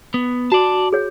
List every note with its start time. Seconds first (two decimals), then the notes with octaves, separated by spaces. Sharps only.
0.14 B3
0.52 F#4 D5 A5
0.93 G#4 C#5